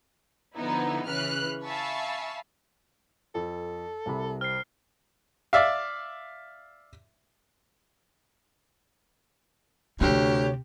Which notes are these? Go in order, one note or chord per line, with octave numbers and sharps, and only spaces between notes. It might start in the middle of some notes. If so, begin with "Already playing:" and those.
D3 F3 B3 D#4 E4
C#3 E3 B4 F6 F#6
E5 F5 G#5 A5 B5 C#6
F2 A4
C2 C3 B5
C4 F6 C7
D5 E5 F5
D2 C3 C4 G4 C#5